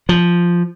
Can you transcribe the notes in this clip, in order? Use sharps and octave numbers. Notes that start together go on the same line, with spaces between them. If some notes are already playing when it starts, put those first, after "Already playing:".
F3